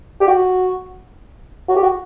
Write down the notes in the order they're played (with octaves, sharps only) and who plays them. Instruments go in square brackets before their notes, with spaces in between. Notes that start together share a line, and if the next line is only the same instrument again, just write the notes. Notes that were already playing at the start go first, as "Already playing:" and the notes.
[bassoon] G4
F#4
F#4
G4
F#4